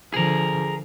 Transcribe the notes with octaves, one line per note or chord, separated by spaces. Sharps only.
D3 F3 G#4 A#4